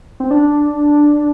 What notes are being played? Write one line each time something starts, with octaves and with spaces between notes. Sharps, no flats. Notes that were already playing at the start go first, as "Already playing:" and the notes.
C4
D4